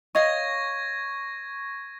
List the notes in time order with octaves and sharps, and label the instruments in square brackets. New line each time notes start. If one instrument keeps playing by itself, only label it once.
[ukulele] C#5 D#5 F5 [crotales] C#6 G#6 A#6